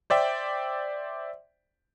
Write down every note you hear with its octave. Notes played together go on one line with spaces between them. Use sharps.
C5 D5 E5 G5